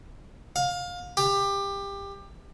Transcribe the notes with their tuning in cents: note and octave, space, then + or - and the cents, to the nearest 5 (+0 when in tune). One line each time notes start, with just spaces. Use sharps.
F5 +25
G4 +20